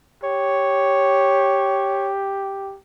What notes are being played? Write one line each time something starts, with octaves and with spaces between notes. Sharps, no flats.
G4 C#5